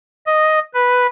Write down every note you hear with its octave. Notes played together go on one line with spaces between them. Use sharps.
D#5
B4